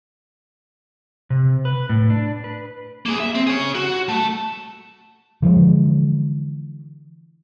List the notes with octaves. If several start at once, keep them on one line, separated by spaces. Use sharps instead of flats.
C3
B4
A2
D4
B4
A#3 G#4
E5
C4
G#4 C#5
F#4
A3 A5
D3 E3 F3 G#3